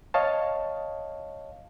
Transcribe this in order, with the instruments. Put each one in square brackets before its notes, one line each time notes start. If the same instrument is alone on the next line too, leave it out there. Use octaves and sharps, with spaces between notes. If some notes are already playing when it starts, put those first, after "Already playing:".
[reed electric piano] C#5 D#5 F5 A5